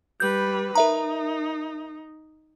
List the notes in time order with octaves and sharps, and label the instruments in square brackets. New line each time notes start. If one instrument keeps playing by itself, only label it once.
[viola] G3 B4 [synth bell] G6
[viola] D#4 [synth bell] A#4 E5 A#5